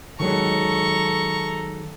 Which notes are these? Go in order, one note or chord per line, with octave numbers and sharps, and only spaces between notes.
D#3 F#3 G#3 A4 A#5 C#6